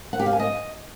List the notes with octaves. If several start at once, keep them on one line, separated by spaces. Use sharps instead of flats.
F#5
G4
F5
G#5
D#5